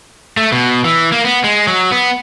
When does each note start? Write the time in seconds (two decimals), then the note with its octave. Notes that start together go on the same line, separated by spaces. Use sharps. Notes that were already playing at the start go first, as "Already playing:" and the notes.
0.37 A3
0.52 B2
0.84 E3
1.12 A#3
1.25 B3
1.44 G#3
1.67 F#3
1.92 B3